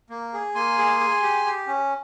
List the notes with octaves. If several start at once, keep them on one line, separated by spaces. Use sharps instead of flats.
A#3
G#4
A#3 G#5 C6
G#4
G#4
G4
G4
C#4